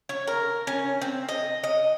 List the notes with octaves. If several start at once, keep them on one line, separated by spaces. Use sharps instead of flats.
C#5
A#4
C#4
C4
D#5
D#5